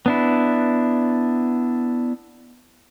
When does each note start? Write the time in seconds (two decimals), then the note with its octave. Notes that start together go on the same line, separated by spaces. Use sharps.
0.06 B3 D4 E4